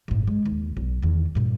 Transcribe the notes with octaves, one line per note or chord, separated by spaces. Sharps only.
G1 A2
G#3
D#2
B1
E2 D#3
G2 A#2